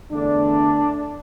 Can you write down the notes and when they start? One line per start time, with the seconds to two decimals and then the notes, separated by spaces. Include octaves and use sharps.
0.11 E2 D3 A3 D4